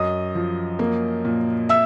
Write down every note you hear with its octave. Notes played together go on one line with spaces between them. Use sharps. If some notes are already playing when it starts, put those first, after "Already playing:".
Already playing: F#2 D#5 D#6
F3
A#3
A#2
E5 E6